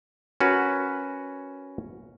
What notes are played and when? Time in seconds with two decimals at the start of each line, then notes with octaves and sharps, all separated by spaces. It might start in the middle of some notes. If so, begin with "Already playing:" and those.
0.41 C#4 F#4 A#4 B4